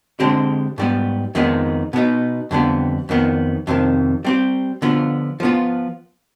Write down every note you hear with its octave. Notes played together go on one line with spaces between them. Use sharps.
D3 G#3 C4 G4
G#2 G3 B3
F2 D#3 G#3 B3 D#4
B2 B3 D#4
F2 D3 G3 B3
F2 D#3 B3
F2 C3 D#3
G3 C4 G4
D3 F3 B3 F4
F3 B3 F4